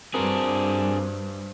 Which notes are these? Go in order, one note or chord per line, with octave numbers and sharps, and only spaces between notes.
G2 C4 D4 F#4 G#4 A#4 C5